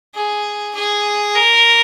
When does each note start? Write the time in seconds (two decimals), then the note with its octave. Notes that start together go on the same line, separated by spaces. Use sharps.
0.15 G#4
0.75 G#4
1.35 A#4